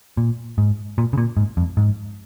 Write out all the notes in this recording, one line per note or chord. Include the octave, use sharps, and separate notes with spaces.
A#2
G#2
A#2
C#3
A#2
G#2
F2
G#2